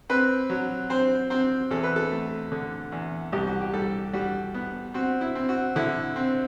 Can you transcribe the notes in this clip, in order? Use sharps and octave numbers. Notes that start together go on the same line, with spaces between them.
C4 B4
F#3
C4 C5
C4 C5
E2 A4
B4
A4
A3
D3
E2
C2 G4
F#4
G4
G3 A4
G3 F#4
B3
C4 F#4
E4
C4
F#4
D3 E4
C4